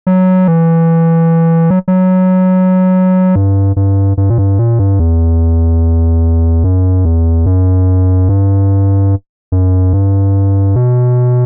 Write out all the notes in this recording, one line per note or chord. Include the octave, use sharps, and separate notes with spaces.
F#3
E3
F#3
F#3
G2
G2
G2
A#2
G2
A#2
G2
E2
F#2
E2
F#2
G2
F#2
G2
B2